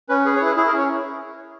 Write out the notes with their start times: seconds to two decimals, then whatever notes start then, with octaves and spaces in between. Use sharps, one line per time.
0.09 C#4 B4
0.25 G#4 B4
0.36 C#5
0.41 E4
0.46 B4
0.57 E4 G#4
0.68 A#4
0.73 C#4
0.78 C#5